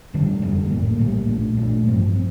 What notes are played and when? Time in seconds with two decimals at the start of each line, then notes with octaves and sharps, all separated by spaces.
0.14 F1 F2 D3 G3
0.42 F1 F2 D3 G3
0.70 A#1 A2 G3 A#3
0.99 A#1 A2 G3 A#3
1.28 A#1 A#2 A3 D4
1.57 A#1 A#2 A3 D4
1.86 A1 G2 F3 C4
2.15 C4